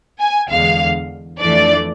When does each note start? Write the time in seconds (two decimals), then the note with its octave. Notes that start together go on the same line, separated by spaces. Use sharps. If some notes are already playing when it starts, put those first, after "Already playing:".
0.20 G#5
0.50 E2 D3 G#3 F5
1.40 F2 E3 A3 D4 D5